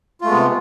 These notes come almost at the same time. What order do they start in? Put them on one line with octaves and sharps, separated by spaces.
F4 A3 G#3 B3 C3